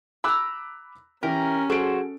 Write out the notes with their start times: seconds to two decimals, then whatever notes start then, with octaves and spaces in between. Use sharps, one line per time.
0.24 A#5 B5 D6 E6 F#6
1.23 E3 C#4 G4 A#4 A#5
1.70 F#3 G#4 A4 C5 D7